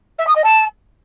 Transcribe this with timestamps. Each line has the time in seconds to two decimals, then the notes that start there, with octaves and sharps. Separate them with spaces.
0.18 E5
0.27 D#6
0.35 D#5
0.44 A5